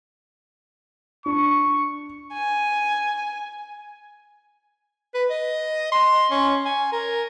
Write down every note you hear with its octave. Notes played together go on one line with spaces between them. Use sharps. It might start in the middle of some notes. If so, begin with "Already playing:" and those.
D4 C#6
G#5
B4
D#5
C6
C#4
G#5
A#4